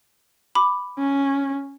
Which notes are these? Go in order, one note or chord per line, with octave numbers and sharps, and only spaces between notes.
B5 D6
C#4